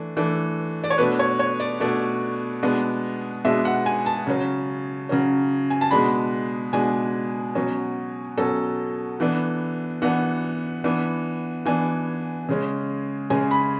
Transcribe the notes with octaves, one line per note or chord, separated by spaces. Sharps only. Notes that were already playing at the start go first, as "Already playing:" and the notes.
Already playing: E3 A3 D4
E3 A3 D4
D5
C#5
B2 A3 D4 B4
C#5
C#5
D5
B2 A3 D4 D5
B2 G#3 B3 D4
B2 G#3 B3 D4 E5
F#5
G#5
A5
C#3 F#3 C#4
C#3 F#3 C#4
G#5
A5
B2 G#3 D4 B5
B2 G#3 D4 G#5
B2 F#3 C#4
B2 F#3 C#4 A4
E3 B3 D4
E3 B3 D4 F#5
E3 B3 D4
E3 B3 D4 G#5
C#3 G#3 C#4
C#3 G#3 C#4 G#5
B5